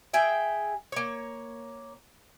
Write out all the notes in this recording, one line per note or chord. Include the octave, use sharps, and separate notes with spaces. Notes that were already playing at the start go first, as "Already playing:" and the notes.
G#4 E5 G5
A#3 C#5